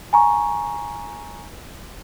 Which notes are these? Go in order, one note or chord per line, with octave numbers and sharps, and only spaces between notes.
G#5 A#5 C#6